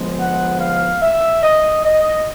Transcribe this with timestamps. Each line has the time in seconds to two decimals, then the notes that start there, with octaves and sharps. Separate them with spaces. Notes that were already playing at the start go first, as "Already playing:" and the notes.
Already playing: D3 F3 G#3 B3
0.18 F#5
0.59 F5
1.01 E5
1.43 D#5
1.84 D#5